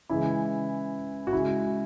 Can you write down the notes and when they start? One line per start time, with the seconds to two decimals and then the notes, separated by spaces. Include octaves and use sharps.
0.10 C#3 E3 G#3 E4
1.27 F#4
1.33 C#3 G#3 E4